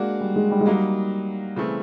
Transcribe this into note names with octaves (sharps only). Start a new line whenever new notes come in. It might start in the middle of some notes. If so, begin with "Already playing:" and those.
Already playing: G#3 A#3 D4 F#4
G3
G#3
G3
G#3
F#3 G3 A#3 D#4
C#3 E3 A3 C4